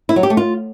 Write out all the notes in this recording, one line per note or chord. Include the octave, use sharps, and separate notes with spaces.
E4
F#3
G4
A3
F4